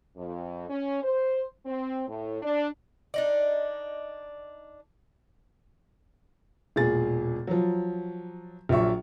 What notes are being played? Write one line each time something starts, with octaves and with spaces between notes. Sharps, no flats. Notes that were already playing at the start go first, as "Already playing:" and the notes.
F2
C#4
C5
C4
A2
D4
D4 D#4 D5
E1 A#2 G#4 A6
F3 F#3
A#1 A#2 F#3 E5 C#6